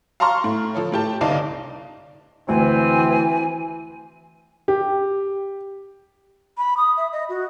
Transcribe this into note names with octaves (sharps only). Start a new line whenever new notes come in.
F5 A5 A#5 C6 C#6 F6
A2
F3 A4 C#5
A2 G4 A5
G1 C2 D#4 D5 F5 A5
D2 E3 C4 G#5
G4
B5
D#6
E5
D#5
F#4